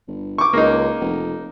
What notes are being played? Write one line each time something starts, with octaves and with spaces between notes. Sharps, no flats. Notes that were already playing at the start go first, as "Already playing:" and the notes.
G1
C#6 D6
C#2 A#3 D#4
F1